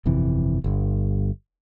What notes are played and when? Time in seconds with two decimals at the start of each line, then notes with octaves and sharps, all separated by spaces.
0.06 G1 F2 C3 E3
0.64 G1 G2